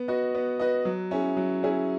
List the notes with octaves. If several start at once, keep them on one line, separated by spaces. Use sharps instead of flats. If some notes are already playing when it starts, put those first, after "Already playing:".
Already playing: B3
F#4 B4 D#5
B3
F#4 B4 D#5
F#3
C#4 E4 G#4
F#3
C#4 E4 G#4